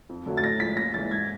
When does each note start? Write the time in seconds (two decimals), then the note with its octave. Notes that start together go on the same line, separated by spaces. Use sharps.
0.09 F2
0.26 D3 F#3 A3
0.37 A6
0.43 A2 A#6
0.60 F3 G#3 B6
0.77 D#2 A#6
0.94 C#3 E3 G#3 A6
1.11 G#2 G#6